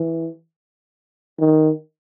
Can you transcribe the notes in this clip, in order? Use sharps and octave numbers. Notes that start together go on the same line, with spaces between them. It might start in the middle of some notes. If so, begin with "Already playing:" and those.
Already playing: E3
D#3